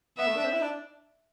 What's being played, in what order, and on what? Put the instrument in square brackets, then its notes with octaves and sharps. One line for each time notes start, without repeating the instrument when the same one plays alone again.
[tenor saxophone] B3 [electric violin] E5
[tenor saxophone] A3
D4
C4
E4
D4